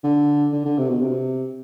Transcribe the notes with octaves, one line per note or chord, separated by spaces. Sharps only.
D3
D3
D3
C3
B2
C3